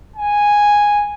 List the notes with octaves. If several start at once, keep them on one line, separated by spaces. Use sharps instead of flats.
G#5